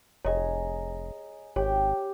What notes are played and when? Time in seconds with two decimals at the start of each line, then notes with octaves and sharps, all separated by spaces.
0.25 F1 G#4 C#5 D#5 A#5
1.56 G#1 G4 C#5 G5